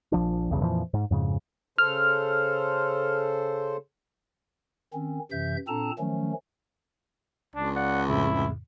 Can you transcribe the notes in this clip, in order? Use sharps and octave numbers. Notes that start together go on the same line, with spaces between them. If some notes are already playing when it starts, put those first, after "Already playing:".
A#1 F3 D4
B1 E2 G2 C#3
F2 A#2 E3 F3
G#2
F2 G#2 C#3
C#3 A4 C5 F6
D#3 C4 C#4
F#2 C3 E3 E5 G6
A#2 C4 D4 A4 A5 A#5
D#3 F3 F#3 A3 C#4
C#2 D4
D5 F5 F#5
F2 A2 C#3 E4